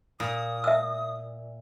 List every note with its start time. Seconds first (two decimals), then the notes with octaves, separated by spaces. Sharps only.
0.20 A#2 D#6
0.64 E5 E6